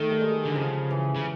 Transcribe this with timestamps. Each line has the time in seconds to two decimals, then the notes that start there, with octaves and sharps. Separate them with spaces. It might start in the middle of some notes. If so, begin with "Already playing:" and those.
Already playing: D#3 A3
0.10 G3
0.21 G#3
0.45 D3
0.56 C#3 F3
0.91 E3
1.15 C#3